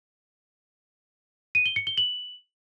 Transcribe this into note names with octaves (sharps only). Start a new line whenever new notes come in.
D#7
G7
C#7
G7
F#7